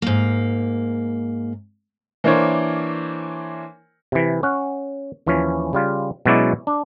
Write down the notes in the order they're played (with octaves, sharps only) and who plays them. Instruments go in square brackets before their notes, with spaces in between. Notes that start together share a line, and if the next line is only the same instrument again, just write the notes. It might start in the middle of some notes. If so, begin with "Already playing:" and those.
[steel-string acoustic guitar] G#2 A#3
[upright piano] E3 A#3 D4 A#4 C5 C#5
[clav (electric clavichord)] C3 E3
C#4 F#5
D#2 E3 F3 C#4
C#3 G3 F4
B2 F#3 G#3 C#4 E4 D5
D4